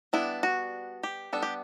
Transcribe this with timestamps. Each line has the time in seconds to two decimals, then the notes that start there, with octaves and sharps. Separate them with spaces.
0.13 G3 B3 D4 E4
0.43 F#4
1.03 G4
1.33 G3 B3 D4 A4
1.43 G4